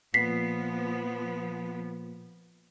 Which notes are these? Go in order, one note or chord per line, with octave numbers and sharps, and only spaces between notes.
A#2 F3 B3 B6 C7